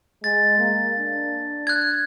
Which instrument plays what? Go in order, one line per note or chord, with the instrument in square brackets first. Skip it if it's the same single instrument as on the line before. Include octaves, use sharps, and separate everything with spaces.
[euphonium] G#3 [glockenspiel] A6
[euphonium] A#3
D4
[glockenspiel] F#6 G#6